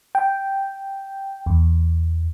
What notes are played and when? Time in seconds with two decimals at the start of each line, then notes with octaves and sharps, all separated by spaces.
0.15 G5
1.46 E2